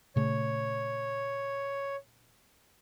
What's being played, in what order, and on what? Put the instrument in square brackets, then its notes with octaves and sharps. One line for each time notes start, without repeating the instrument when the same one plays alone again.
[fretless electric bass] A#2 C#3 A3 [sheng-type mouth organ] C#5